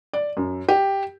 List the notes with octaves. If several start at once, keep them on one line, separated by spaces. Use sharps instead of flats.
D5
F#2
G4